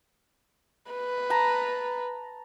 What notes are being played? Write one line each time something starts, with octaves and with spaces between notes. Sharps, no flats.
B4
A5 A#5